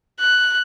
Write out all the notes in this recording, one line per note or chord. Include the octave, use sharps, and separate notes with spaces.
F#6